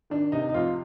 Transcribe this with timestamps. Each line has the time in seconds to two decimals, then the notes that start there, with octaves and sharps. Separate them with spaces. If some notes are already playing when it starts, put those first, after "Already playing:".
0.10 D#3 D4
0.32 C3 D#4
0.49 D#4
0.54 F2 F4